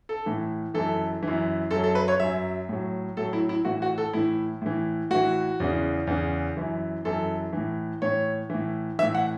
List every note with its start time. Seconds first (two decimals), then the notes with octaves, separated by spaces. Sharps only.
0.09 A4
0.26 A2 E3
0.74 F#2 E3 A4
1.23 F#2 E3
1.71 F#2 A4
1.76 F#3
1.84 A4
1.95 B4
2.08 C#5
2.20 F#2 F#3 E5
2.69 A2 F#3
3.17 A2 F#3 A4
3.33 E4
3.49 E4
3.65 A2 E3 F#4
3.82 F#4
3.98 A4
4.13 A2 E3 E4
4.62 A2 E3
5.10 A2 E3 F#4
5.60 E2 C#3 E3
6.07 E2 C#3 E3
6.57 F#2 E3
7.05 F#2 E3 A4
7.53 A2 E3
8.02 A2 E3 C#5
8.50 A2 E3
8.99 E3 E5
9.03 A2
9.15 F#5